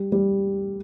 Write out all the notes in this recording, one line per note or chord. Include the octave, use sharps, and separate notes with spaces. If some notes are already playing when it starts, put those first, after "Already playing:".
Already playing: G3
G3